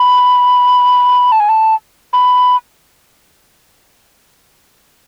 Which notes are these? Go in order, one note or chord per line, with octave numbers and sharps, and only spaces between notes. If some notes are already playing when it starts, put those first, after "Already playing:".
Already playing: B5
A5
G#5
A5
B5